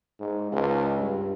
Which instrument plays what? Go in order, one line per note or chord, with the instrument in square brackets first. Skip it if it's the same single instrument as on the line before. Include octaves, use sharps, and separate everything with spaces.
[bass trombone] G#2
C#2
G2